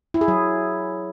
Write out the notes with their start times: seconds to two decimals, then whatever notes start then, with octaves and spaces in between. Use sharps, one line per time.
0.14 E4
0.21 G#4
0.28 F#3